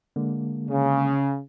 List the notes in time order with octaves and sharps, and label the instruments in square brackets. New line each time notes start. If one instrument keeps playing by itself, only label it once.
[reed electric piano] D3 G#3 A#3
[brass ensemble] C#3